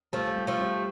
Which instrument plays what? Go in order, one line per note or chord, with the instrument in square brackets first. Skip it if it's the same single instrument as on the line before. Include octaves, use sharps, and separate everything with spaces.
[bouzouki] F3 A3 [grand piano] G3
[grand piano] G3
[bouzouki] F3 A3
[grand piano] G3